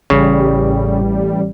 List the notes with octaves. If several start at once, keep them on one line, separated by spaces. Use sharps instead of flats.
A1 C#3 G3